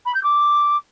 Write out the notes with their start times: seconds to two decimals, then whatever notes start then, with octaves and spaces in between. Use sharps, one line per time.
0.06 B5
0.15 G6
0.23 D6